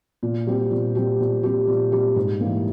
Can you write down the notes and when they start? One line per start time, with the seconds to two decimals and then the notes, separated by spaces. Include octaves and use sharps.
0.23 A#2
0.47 G3 C4 G4
0.71 A#2
0.95 G3 C4 G4
1.20 A#2
1.43 G3 C4 G4
1.68 A#2
1.92 G3 C4 G4
2.16 G#2
2.40 E3 G3 A#3